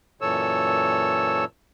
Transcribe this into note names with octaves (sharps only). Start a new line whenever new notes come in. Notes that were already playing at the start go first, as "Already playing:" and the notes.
F#2 A#2 E3 A4 C#5 E6